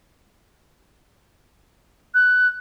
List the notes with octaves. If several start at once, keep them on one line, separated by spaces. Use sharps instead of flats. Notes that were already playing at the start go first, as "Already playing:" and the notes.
F#6